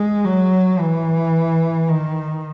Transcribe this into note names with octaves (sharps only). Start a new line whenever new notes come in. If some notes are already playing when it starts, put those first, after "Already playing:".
Already playing: G#3
F#3
E3
D#3